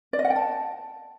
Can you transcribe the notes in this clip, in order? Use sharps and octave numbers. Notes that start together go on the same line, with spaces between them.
D5
D#5
F#5
G5
A5